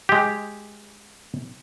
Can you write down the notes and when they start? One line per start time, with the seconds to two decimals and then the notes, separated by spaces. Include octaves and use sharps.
0.09 G#3 G4